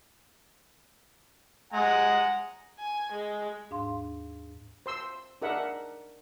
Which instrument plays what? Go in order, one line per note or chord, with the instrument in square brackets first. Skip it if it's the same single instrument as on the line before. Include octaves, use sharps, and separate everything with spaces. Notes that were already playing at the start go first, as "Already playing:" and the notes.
[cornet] G#3 [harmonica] F#5 G#5 A#5
[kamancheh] G#5
G#3
[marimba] D#2 G#2 D4 F5 C6
[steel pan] C5 C6 E6
D4 D#4 G#4 A#4 E5 F#5